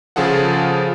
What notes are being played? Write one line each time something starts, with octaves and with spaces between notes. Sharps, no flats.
C#3 F3 F4 G#4 A4 F#5